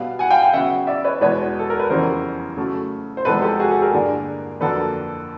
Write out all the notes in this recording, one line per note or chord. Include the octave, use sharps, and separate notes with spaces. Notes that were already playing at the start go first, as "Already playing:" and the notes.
Already playing: B2 G3 B3 F5
F#5 G#5
F5 G5
F5 G5
C#3 F#3 B3 E5 F#5
D5 E5
B4 C#5
E2 B2 G#3 B4 C#5
A4
A#4
B4
F2 C#3 E3 G3 B3 A#4 C5
C#3 F#3 A3
C5
E2 C3 F3 G#3 B3 A4 B4
G4 A4
F#4 G#4
G4 A4
G#4 A#4
G2 D3 G3 A#3
F2 D3 F#3 A#3 A4 B4